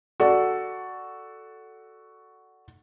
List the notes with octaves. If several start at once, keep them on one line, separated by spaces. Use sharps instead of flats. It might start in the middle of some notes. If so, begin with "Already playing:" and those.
F#4 A4 D5